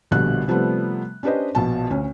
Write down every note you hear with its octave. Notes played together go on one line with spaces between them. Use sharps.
A#1 B2 D3 G3 F#6
C3 F3 G3 A3 B3
C#4 D4 G4 B4 C5 D#5
A#1 B2 A5
D2 C#4